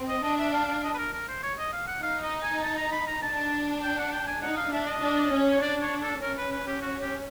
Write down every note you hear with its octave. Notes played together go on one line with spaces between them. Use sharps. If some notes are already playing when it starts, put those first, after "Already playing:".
Already playing: C4
D#5
D4 D#5
E5
F5
F5
D#5
B4
A#4
A#4
C5
C#5
D#5
F5
F#5
D#4 F5
D#5
G#5
A5
A#5
B5
A#5
D4 A5
G5
F#5
G5
G#5
D#4 F#5
F5
D4 E5
D#5
D4
C#4
C#5
D4 D5
C#5
A4
C#4 A#4
B4
B4
G4
F#4
G4